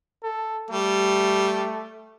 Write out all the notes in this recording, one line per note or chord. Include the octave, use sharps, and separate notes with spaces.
A4
G3 A3